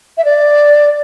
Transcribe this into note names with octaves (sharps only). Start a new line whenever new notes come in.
E5
D5